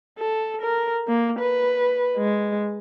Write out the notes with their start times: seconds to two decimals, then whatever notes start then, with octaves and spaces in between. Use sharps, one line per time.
0.19 A4
0.62 A#4
1.08 A#3
1.39 B4
2.17 G#3